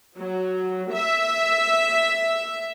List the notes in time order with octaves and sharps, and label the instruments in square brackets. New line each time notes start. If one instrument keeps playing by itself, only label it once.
[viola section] F#3
E5